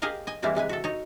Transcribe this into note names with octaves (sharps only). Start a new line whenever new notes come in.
G4 G#4 A#4 D#5 F5
D#5 G#5
E3 G3 G#3 A#3 C4 E4
C3 G#3 B4 G#5
F#4 A4
D#4 C#5